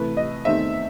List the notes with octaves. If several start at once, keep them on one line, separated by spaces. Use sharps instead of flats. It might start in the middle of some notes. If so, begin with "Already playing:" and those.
Already playing: C3 E3 A3 B4
D#5
E2 D#3 A3 C4 D#4 E5